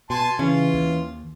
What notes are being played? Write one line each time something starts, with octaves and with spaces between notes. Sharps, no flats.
B2 G#5 A5 C6
C#3 E3 C#4 F4
D#2